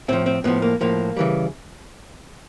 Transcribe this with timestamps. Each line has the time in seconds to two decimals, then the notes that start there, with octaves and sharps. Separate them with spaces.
0.08 A2 F3 C4
0.26 C4
0.44 A2 F3 B3
0.62 A#3
0.81 A2 F3 A#3
1.17 C#3 E3 G3